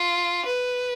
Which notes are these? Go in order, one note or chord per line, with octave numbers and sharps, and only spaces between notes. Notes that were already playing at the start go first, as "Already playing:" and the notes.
Already playing: F4
B4